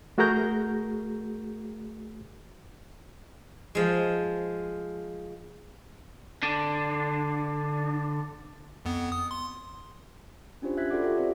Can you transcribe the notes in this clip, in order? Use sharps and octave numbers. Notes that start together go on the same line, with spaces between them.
A3 F#4 G#4 A#4 A#5 G6
F3 G#3
D3 D4
F2 B3
D#6
C6
C#4 D4 F4 G4 C5
E5 F#6 G#6 B6
F4 F#4 A4 D5 F#5 D6
G4 A4 E5
C4 C5 D5